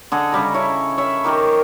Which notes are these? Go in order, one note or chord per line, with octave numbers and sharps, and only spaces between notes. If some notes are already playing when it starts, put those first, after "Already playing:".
D3 G#4 A4 D#5
C#3 G3 A#5
C#4 E4 C#5 A5
C#5 E5 F5 B5
D#3 G4 A#4 A#5